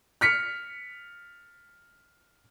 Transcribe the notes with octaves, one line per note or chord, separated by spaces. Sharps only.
F6 B6 C#7